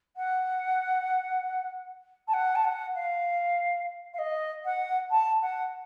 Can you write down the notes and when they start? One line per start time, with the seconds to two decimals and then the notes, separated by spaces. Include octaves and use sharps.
0.17 F#5
2.28 A5
2.33 F#5
2.55 A5
2.65 F#5
2.95 F5
4.14 F5
4.18 D#5
4.65 F#5
5.11 A5
5.42 F#5